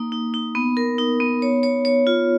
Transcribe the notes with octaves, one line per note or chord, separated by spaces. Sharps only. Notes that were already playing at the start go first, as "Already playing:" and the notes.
Already playing: A#3 D#4
D#4
D#4
B3
A#4
D#4
B3
C#5
C#5
C#5
F4